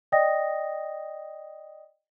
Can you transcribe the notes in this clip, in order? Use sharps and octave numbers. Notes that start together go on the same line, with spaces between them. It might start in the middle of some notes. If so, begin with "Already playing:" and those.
D5 D#5 G5 D#6 A#6